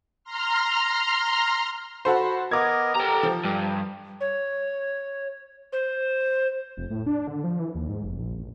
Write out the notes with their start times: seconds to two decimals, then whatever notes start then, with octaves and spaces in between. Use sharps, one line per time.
0.24 A#5 C6 F6
2.05 F#4 A4 C5 B5
2.51 B3 A#4 D#5 D6 G#6
2.96 G4 A4 A#5
3.23 F3
3.44 G2 G4
4.21 C#5
5.73 C5
6.77 F1
6.90 A2
7.06 D4
7.27 D3
7.44 F3
7.60 E3
7.75 D#2
7.89 G#2
8.04 F1
8.19 A#1
8.38 A1